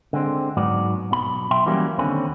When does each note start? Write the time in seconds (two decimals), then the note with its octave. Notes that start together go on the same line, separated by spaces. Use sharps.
0.13 D3 G#3 C4
0.57 G#2 F#3 B3 D5
1.11 B1 B2 B5
1.51 B1 E5 G5 C6
1.66 E3 F#3 G3 A#3 C#4 E4
1.98 D#2 D3 C4 C#4 B5